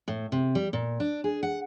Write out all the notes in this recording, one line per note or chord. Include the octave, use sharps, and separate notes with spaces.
A2
C3
G3
A#2
D4
G#4
F#5